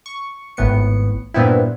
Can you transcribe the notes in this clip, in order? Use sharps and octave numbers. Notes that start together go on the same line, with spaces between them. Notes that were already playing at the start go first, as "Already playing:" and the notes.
C#6
G#1 A2 B3 C#7
G2 A#2 B3 C4 E4